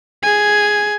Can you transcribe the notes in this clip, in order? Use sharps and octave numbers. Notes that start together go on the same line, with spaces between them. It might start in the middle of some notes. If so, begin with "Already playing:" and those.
G#4 G#5